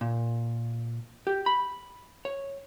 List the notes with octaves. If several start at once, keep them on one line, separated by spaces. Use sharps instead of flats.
A#2
G4
B5
C#5